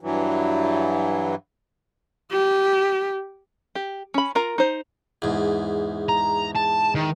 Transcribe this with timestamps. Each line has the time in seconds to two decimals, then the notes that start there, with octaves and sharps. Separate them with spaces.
0.01 G2 E3 F#3
2.32 G4
3.75 G4
4.14 C#4 B5
4.35 F4 A#4 A#5
4.58 D#4 C5
5.22 E2 G#2
6.09 A#5
6.56 A5
6.95 D#3